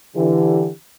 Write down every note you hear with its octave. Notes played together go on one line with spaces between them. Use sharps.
D3 E3 G4